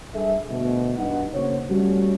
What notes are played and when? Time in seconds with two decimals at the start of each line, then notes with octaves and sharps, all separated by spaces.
0.14 G2 G#4 A4 E5
0.49 D2 B2
0.98 G2 D#4 F#5
1.34 C#3 A#3 F#4 C5 C#5
1.69 G3 A3 C#4 F#4